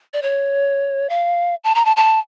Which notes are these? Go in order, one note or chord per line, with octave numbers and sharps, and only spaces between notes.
D5
C#5
F5
A5
A#5
A5
A5